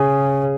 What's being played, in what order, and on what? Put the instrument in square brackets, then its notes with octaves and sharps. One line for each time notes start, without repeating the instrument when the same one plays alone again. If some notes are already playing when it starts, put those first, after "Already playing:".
Already playing: [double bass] C#3 [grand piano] G#4